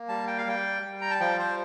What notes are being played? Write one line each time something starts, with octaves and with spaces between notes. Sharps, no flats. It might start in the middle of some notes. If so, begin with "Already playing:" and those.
Already playing: A#3
G3 A5
G5
F5
G3 G5
G3
A#5
A5
F3 G5
C5